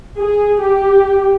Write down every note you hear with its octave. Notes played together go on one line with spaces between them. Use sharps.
G#4
G4